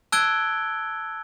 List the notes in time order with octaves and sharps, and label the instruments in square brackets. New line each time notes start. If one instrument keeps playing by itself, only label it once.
[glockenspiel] A5 E6 F#6 G#6 D7 G7